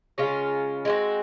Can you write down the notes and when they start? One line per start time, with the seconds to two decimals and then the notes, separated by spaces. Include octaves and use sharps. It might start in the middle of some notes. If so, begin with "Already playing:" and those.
0.18 C#3 G#3 C#4 F4
0.85 G#3 C4 F#4